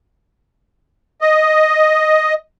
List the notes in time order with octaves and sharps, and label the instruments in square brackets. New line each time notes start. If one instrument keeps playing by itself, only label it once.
[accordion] D#5